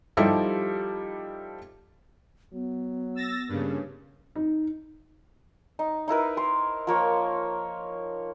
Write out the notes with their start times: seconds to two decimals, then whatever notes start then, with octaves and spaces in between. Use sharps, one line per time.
0.17 F3 G3 D#4 E4 G4 A4
2.53 F#3 B3
3.15 E6 A6 A#6
3.49 G2 C#3 A#3
4.35 D#4
5.79 D#4
6.08 D#4 E4 A#4 B4
6.37 C5 C6
6.87 F3 A#3 C#5